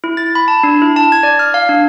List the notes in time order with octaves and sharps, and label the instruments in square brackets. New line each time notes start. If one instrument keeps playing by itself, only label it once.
[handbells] E4
A6
B5
A5
D4
E4
A5
G#6
D5
F6
F5
D4